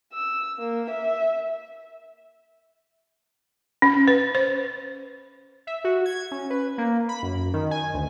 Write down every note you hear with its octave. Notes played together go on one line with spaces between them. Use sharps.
E6
A#3
E5
C#4
B4
C5
E5
F#4
G#6
C#4
B4
A#3
B5
F#2
D#3
G#5
D2